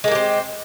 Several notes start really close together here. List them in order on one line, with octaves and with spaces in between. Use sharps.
G#3 A#3 G4 C4